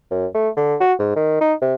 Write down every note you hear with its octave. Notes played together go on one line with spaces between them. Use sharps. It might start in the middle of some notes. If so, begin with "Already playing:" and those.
F#2
A3
D3
F#4
G#2
D#3
D#4
C3